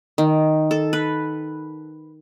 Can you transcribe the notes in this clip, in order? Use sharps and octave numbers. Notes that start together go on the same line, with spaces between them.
D#3
A4
B4